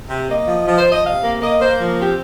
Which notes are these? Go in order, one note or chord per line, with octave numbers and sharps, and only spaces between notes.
C3
A#3 D#5
F3
F3
C5
F3
D#5
C3 F5
A#3
A#3 D#5
A#3 C5
F3
C4 G4